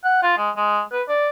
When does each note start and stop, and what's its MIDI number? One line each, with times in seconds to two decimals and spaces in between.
0.04 0.20 78
0.23 0.33 65
0.37 0.50 56
0.56 0.81 56
0.92 1.03 71
1.08 1.30 74